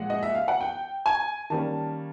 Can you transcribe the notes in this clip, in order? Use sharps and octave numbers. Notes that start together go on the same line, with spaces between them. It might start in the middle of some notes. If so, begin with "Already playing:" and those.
Already playing: A#2 F3 G#3 F#5
D#5
E5
F5
F#5
G5
G#5
D#3 G3 A#3 C#4 A5